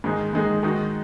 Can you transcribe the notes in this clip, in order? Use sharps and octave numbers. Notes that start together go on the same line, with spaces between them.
G#2 D#3 G#3 D#4 G#4
G#2 D#3 G#3 D#4 G#4
D#3 G#3 D#4 F#4